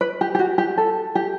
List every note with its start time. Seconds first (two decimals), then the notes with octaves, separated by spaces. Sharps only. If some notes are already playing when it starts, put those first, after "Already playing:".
0.01 B4
0.21 G4
0.35 G4
0.39 F#4
0.58 G4
0.77 A4
1.15 G4